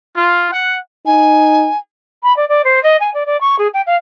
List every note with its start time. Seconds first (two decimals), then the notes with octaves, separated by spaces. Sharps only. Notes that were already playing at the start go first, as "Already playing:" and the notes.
0.16 F4
0.52 F#5
1.06 D#4 G#5
2.23 B5
2.36 D5
2.48 D5
2.64 C5
2.83 D#5
3.00 G#5
3.14 D5
3.26 D5
3.40 C#6
3.58 G#4
3.73 G5
3.86 F5